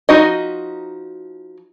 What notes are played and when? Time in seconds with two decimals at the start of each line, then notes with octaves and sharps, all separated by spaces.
0.09 F3 D#4 F#4 D#5